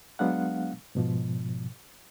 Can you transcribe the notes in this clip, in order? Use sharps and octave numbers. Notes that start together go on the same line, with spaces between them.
F#3 G#3 B3 D4 F5 F#5
G#2 B2 F3